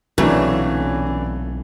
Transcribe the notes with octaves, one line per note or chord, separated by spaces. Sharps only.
B1 A#2 C#3 E3 F#3 A3 C4 D4